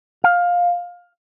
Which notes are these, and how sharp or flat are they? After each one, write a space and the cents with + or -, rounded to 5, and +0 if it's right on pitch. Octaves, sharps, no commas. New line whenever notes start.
F5 +15